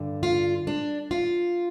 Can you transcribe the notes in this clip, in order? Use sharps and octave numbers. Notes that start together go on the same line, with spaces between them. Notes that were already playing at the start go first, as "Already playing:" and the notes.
Already playing: G2 D3
F4
D4
F4